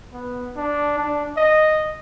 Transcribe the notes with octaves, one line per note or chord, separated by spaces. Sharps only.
B3
D4
D4
D#5